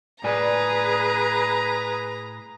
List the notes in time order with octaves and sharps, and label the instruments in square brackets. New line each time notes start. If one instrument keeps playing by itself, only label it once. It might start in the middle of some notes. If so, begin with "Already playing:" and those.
[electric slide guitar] A2 D5 G#5 [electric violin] G#4 B4 [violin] A#5